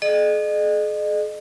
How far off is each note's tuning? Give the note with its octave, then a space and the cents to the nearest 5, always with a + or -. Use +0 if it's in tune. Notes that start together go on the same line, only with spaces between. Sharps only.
G#4 +45 D#5 -40